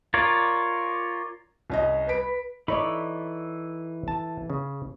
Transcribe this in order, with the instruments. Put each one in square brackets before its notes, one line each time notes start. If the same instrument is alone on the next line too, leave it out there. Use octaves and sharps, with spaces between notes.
[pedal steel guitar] F4 A#4 C#5 D5
[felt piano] C2 C#4 D#5
[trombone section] B4 [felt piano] B6 D7
[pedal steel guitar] E3 A4 B5 [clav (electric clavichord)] D#4 C#5 D5
[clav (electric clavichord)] A5
C#3